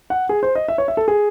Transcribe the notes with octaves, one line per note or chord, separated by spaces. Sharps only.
F#5
G#4
C5
D#5
E5
C#5
E5
A4
G#4